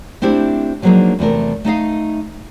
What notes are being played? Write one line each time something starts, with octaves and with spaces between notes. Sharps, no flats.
A3 C4 D4 E4 G4 C5
F3 F#3 G#3 A#3 D4 D#4
E2 C3 A3 A#4
A3 D#4 D#5 F5